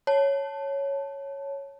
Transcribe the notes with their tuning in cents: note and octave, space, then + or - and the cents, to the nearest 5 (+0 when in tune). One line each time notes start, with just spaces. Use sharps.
C#5 +0 A5 +0